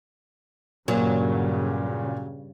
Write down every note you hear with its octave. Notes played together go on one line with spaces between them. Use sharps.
G2 A#2 C#3 F#3